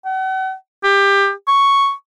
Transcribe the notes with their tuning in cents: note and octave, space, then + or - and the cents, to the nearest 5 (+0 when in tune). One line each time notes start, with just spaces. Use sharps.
F#5 +40
G4 +20
C#6 +0